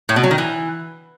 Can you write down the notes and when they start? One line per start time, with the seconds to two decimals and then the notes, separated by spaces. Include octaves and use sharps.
0.09 A2
0.16 B2
0.23 F#3
0.31 D#3
0.38 E3